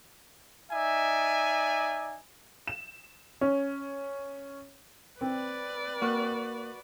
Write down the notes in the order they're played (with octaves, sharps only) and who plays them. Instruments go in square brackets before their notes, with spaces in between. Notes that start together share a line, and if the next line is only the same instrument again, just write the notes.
[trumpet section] D#4 D5 E5 G#5
[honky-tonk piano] E7
C#4
[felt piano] C4 [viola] B4 D5
[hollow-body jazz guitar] A#3 [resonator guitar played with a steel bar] F#4